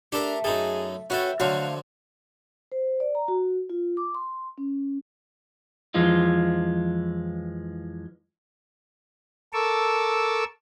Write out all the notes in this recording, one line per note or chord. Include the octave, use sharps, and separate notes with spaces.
A3 D4 G4 A4 A#4
F#2 D#4 G#4 A4
C#4 F#4 A4 B4 E5 G5
D3 F3 F#3 A3 F#4 F5
C5
D5
A#5
F#4
F4
D6
C6
C#4
F2 E3 F3 G#3 F4
A4 A#4 A5 C#6 D6 E6